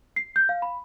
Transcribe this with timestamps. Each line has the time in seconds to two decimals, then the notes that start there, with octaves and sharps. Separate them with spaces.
0.16 C7
0.36 G6
0.49 F5
0.62 B5